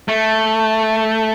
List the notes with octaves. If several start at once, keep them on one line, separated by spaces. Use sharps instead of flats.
A3